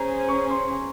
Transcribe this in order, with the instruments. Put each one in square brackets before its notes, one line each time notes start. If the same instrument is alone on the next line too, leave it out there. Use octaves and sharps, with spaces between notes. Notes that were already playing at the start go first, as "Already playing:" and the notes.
Already playing: [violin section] C#4 G#4 C5 [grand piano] A#5
[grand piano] C#6
C6